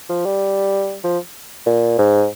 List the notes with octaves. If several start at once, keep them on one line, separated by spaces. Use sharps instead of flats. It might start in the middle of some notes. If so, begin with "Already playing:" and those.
F3
G3
F3
A#2
G#2